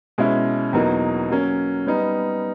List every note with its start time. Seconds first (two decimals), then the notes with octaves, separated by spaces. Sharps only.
0.18 B2 G#3 C#4 E4
0.73 E2 B2 F#3 A#3 D#4
1.30 F#3 A#3 C#4
1.87 G3 B3 D#4